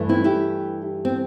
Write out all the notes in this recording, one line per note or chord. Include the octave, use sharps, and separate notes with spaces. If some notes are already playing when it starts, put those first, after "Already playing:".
Already playing: G2 E3 A3
C4 E4
E4 G4
C4